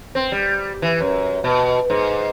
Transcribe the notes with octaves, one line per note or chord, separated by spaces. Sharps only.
C4
G3
E3
F#2
B2
G#2